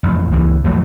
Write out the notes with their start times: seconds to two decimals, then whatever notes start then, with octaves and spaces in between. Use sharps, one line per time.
0.03 A1 F2
0.31 C#2 E3
0.64 F2 A2 E3 F#3